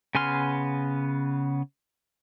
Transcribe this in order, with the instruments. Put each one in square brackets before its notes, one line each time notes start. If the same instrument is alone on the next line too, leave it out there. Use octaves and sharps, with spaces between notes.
[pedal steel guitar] C#3 B3 G#5 C6 F6